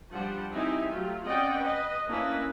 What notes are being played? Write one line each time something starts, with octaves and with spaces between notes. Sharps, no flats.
F3 G3 D4 G4 C5 F#5
C4 D#4 E4 G4 E5 G#5
F#3 A3 F4 G4
C4 C#4 D5 D#5 F#5 G5
B4 D#5
A#3 C#4 D4 E4 B4 D#5